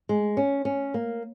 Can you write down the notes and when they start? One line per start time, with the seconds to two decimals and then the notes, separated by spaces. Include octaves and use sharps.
0.09 G#3
0.37 C#4
0.65 C#4
0.94 A#3